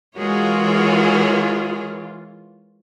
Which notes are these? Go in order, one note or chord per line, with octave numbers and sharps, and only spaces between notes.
E3 G#3 F4 F#4 G#4 A#4 C#5